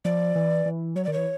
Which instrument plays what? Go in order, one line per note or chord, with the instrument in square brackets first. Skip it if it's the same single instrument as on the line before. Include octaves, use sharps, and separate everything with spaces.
[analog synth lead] F3 [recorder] D5
[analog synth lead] E3
E3
[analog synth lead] F#3 [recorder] C#5
[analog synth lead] D#3 [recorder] D5
[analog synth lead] E3 [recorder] C#5